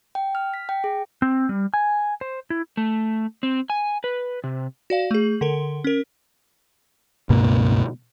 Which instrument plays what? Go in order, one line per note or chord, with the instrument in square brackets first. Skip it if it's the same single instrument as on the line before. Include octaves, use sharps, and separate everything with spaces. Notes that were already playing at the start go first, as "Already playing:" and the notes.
[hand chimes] G5
F6
B6
G5
G#4
[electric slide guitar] C4
G3
G#5
C5
E4
A3
C4
G#5
B4
C3
[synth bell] F#4 D5 F5
A3 G#4
D3 A4 A#4
C#4 A#4
[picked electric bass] C#2 G2 B2 A#3